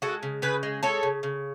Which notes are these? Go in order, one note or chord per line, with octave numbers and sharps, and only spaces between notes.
G#3 F#4 A4
C#3
C#3 G#4 B4
G#3
G#3 A4 C#5
C#3
C#3